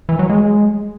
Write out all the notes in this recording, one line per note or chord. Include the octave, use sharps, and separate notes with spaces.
E3
F#3
G#3